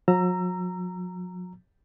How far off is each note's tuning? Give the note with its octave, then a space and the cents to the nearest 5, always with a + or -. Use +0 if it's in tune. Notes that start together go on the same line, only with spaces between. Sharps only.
F#3 -45 A#5 -10 E6 +25